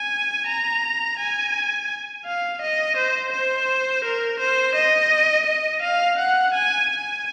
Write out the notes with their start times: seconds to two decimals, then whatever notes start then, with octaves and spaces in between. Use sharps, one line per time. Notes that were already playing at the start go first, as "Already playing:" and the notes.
Already playing: G#5
0.47 A#5
1.19 G#5
2.25 F5
2.62 D#5
2.97 C5
3.32 C5
4.04 A#4
4.40 C5
4.75 D#5
5.46 D#5
5.82 F5
6.19 F#5
6.54 G#5
6.90 G#5